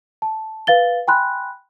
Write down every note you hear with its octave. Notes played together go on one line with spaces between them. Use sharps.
A5
B4 F5 A6 G7
G5 G#5 B5 C6 F#6